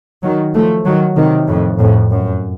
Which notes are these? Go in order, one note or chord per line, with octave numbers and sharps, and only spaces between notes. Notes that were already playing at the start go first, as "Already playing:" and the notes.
D#3 F#3
F3 A3
D#3 F#3
C3 D#3
F2 A2
F2 A2
F#2